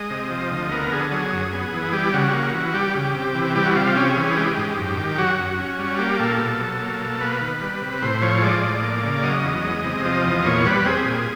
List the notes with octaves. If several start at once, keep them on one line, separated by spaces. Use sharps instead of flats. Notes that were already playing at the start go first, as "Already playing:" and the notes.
Already playing: G#3 D#5
C3
F3
D2
B3 A#4
D3 G#4
F#3 G#4
F#2
B3
E3
G3 G4
C#3 F#4
A#3
E3
G3 G4
C#3
C3
E3
G3 G4
F#4
C3 F4
F4
C#4 G4
G#4
E3
G#4
G#3 G4
G#2
F#2
D#3
F#3 F#4
F#2
C#4
G3
A#3 G4
A#2 A4
B2
F#3
A#3
B2
A#3 B4
D#3
G3
C3
A2 C5
F3 C#5
G#3 D5
A2
A#3
C#3
F#3 D#5
E2
G#3
C3
F3 D#5
E2
A#2 C#5
G3 B4
C4 G#4
A#2